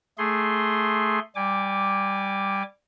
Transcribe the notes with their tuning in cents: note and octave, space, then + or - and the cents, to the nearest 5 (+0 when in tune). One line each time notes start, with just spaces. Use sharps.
A3 +0 G#4 +0 C6 +0
G3 +0 G#5 -25 D6 +0